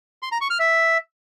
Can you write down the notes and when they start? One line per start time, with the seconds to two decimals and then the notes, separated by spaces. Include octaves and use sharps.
0.23 C6
0.32 A#5
0.41 C#6
0.50 F6
0.59 E5